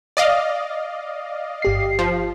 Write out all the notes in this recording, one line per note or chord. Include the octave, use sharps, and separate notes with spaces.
D5 D#5 F5
G1 G4 C7
F3